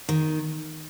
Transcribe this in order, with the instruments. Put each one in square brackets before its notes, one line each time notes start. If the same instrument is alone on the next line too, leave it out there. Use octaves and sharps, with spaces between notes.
[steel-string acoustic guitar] D#3